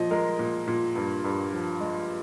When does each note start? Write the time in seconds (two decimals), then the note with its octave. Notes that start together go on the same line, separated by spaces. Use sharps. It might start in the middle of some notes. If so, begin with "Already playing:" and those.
Already playing: A#2 F3 D#5
0.11 G#3 A#4
0.39 A#2
0.68 A#2
0.95 G2
1.24 G2
1.52 F3
1.80 G#3